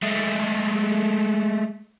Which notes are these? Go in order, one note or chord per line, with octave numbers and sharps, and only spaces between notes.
G#3 A3